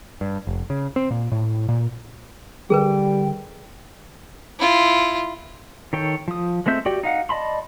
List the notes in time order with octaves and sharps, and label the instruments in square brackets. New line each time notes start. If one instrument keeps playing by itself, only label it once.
[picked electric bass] G2
F1
C#3
C4
A#2
A2
A#2
[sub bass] D3 [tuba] G3 [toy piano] G#4 A#4 B4 [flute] G5
[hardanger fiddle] E4 F4
[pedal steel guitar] D#3 A4 C#5 G5
F3 D#6
G#3 A3 C4 E5 G6
F#4 G4 D5 G5
D#4 F5 F#5
D5 D#5 A5 B5 C6